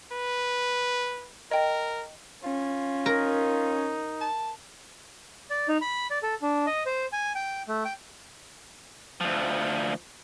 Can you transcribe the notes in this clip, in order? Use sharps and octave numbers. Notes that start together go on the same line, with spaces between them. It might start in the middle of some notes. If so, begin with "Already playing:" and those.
B4
A#4 D#5 G5
C#4 F4
D#4 A#4
A5
D5
D#4
B5
D5
A4
D4
D#5
C5
G#5
G5
A3
G5
D2 F3